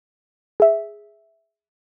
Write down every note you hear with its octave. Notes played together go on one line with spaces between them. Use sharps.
G#4 E5